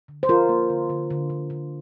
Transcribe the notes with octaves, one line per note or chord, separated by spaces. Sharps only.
D3
C5
F3 F4 A#4
A#3
D3
D3
D3
D3
D3